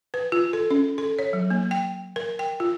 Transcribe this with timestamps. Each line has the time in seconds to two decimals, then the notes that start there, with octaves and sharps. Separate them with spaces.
0.14 B4
0.32 F4
0.53 A4
0.71 C#4
0.98 A4
1.19 C#5
1.33 F#3
1.50 A#3
1.71 G5
2.16 A#4
2.39 G5
2.60 F4